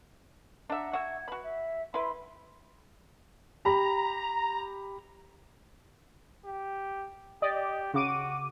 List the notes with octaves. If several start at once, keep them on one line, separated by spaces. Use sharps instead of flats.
D4 E5 F#5 A#5
F#4 E5 G#6
F#4 B4 B5
E5
E4 B4 E5 B5 C6
G4 A#5 B5
G4
G4 D5 D#5
C#3 F#4 D6 D#7